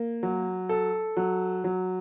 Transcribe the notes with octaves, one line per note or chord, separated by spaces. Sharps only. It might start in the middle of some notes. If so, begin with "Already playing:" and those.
Already playing: A#3
F#3
A4
F#3
F#3